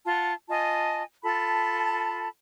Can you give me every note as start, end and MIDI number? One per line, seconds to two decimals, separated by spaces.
0.05 0.32 65
0.05 0.32 78
0.05 0.32 81
0.49 1.03 65
0.49 1.03 75
0.49 1.03 80
0.49 1.03 81
1.22 2.28 65
1.22 2.28 69
1.22 2.28 81
1.22 2.28 83